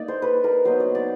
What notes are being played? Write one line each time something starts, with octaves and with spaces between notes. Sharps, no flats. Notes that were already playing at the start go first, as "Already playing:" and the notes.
Already playing: A#3 D#4 D5
C5
B4
A#4
F#3 B3 D#4 C5
D5
D5